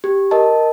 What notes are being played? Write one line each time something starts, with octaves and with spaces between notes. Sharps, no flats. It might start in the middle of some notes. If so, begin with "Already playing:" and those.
G4
A#4 D#5 A5